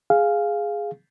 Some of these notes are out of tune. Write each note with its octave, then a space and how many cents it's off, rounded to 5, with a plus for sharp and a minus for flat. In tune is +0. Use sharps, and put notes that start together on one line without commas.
G#4 +0 F5 +0